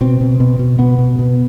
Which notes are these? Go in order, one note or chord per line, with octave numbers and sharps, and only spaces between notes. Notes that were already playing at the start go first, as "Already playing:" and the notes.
B2 C4
B2
B2
B2
B2 B3
B2
B2